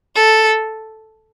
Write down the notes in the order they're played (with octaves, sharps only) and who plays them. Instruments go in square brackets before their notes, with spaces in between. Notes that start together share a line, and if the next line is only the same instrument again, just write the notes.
[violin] A4